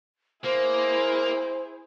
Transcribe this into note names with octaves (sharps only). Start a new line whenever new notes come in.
A#3 E4 G#4 C5